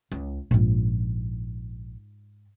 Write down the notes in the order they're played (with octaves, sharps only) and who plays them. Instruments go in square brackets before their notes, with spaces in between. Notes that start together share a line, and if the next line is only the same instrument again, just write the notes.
[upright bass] C#2
[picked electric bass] A#1 [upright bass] G#2 F4